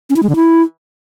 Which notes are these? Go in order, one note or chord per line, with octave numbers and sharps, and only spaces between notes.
C#4
E4
G#3
D3
E4